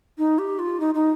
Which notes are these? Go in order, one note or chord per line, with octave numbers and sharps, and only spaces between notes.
D#4
G4
F4
D#4
D#4